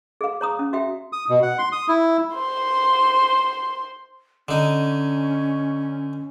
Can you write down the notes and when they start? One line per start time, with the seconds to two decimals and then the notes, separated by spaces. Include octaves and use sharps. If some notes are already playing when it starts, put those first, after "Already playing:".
0.21 G#4 F5
0.41 C#5 A#5 D#6
0.59 C#4
0.73 F#4 E5 G5
1.13 D#6
1.29 B2
1.43 F#5
1.58 C6
1.72 D#6
1.88 E4
2.34 C5 C6
4.48 D3 C#4 D#4